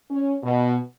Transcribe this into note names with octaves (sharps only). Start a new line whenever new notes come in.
C#4
B2